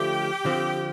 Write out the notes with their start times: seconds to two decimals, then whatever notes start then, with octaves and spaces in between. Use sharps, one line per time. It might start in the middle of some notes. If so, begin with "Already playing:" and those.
Already playing: D3 F3 A3 G4
0.45 D3 F3 C4